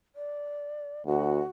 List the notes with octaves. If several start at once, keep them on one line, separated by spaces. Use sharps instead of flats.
D5
D2 F#4